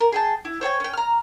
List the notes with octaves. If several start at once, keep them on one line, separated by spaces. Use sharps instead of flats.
A#4
G#4 G5 A5
E4
C5 C#5 G5 G#5
C#4 G5
A#5 F6